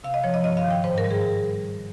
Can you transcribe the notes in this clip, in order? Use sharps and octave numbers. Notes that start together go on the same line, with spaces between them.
C3 F5
D#5
F3 C#5
D#5
G2 D#5
F5
D#3
G5
G#2 C5
A#4
G3
G#4